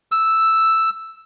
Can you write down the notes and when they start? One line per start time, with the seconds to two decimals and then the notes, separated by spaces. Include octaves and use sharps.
0.12 E6